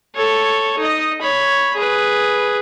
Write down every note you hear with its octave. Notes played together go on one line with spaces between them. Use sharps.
A4 C#5
D#4 D#5
C#5 B5
G#4 B4